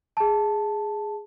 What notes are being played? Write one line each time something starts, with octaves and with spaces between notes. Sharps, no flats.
G#4 A5